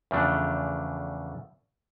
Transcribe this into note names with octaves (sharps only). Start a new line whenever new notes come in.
E2 C#3 F3 A3 D4